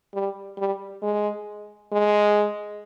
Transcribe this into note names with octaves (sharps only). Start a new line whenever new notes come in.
G3
G3
G#3
G#3